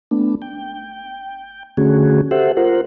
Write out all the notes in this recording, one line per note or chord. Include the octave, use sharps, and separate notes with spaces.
A3 B3 D4
G5
D3 A3 C#4 F#4 G#4
G4 A4 C5 E5 F#5
F4 A#4 C5 F#5